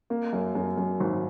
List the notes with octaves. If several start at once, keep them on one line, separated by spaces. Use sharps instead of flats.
A#3
F#2
F#2
F#2
G#1